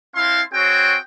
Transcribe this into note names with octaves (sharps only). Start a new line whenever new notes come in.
C4 E4 F5 A5 C6
C4 F#4 G#4 C#5 G5